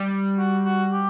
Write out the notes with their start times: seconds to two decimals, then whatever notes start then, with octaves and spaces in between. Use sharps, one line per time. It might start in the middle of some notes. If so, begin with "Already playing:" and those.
Already playing: G3
0.38 F#4
0.65 F#4
0.92 G4